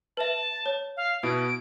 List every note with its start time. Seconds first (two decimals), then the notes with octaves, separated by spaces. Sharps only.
0.17 B4 E5 A5
0.66 C#5
0.97 F5
1.23 B2 B3 E4 D7